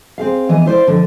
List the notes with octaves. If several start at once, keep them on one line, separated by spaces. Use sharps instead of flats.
C4 G#4 F5
E3 B3 D#5
E4 C5 D5
F2 D3